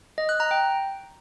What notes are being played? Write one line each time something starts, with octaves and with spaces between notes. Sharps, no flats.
D#5
F#6
A#5
G5